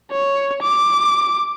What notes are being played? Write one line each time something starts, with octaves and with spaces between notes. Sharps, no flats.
C#5
D6